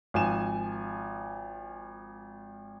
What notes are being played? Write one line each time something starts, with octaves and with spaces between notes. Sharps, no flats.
G#1 F3 G#5 E7